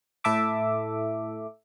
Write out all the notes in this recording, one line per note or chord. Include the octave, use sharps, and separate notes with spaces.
A2 E4 A4 E5 D6